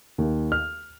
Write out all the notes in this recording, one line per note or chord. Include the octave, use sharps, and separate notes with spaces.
D#2
F6